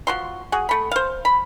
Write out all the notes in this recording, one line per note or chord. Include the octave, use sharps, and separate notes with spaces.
F3 F#4 C6
F#4 G#4
A3 B5
C5 F5
B5